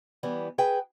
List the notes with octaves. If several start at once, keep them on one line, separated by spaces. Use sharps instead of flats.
E3 G3 B3
G#4 B4 G5